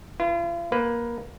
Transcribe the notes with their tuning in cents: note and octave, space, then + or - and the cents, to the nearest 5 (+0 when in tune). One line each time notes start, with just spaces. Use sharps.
F4 -40 B4 +0
A#3 +15 B4 +10